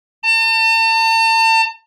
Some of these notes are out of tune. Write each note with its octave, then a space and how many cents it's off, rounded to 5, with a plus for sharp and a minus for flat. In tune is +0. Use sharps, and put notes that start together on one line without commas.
A5 +40